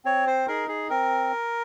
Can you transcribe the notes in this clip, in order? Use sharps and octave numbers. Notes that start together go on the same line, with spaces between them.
C4 C#5
C5
D#4 G#4 A#4
G#4
C4 A#4